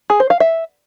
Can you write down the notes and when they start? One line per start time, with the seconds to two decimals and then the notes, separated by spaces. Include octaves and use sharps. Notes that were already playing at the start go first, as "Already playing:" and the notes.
0.10 G#4
0.20 C5
0.30 F5
0.40 E5